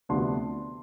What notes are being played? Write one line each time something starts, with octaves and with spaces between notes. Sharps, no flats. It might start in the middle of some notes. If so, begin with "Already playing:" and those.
D2 C3 F3 B3 D4 C6